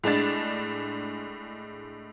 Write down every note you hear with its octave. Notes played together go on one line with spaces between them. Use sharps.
A2 G#3 D4 A6